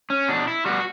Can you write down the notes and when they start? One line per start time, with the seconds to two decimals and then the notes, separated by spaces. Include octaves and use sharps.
0.10 C#4
0.29 B2 D4
0.48 E4
0.65 G3 B3 F#4